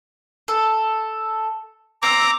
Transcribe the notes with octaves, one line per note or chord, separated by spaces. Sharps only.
A4
C4 A#5 D6 E6